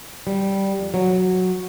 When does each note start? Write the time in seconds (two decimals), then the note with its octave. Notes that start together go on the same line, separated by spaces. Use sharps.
0.27 G3
0.79 F2
0.94 F#3